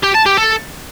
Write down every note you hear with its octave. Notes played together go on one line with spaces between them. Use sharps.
G4
A5
G4
A4